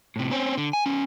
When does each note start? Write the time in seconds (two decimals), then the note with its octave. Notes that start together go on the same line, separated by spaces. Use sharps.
0.16 A2 C3
0.31 C4 C#4
0.58 D3
0.73 G#5
0.86 B3 C#4